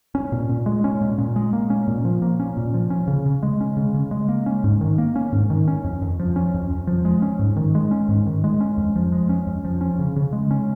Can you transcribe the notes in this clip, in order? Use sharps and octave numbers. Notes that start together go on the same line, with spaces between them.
C#4
A#2
A#2
G#3
C#4
A#2
A#2
G#3
A#3
C#4
A#2
F3
A#3
C#4
A#2
F3
C#4
C#3
C#3
G#3
C#4
C#3
C#3
G#3
A#3
C#4
G#2
D#3
A#3
C#4
G#2
D#3
C#4
F2
F2
F3
C#4
F2
F2
F3
G#3
C#4
G#2
D#3
G#3
C#4
G#2
D#3
G#3
C#4
F2
F3
G#3
C#4
F2
F3
C#4
C#3
C#3
G#3
C#4